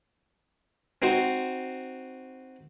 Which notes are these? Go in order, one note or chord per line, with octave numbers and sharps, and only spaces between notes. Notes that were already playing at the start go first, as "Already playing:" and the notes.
C4 D#4 F#4 C5